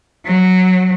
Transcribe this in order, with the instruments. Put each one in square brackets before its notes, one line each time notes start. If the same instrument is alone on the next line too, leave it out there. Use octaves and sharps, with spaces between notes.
[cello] F#3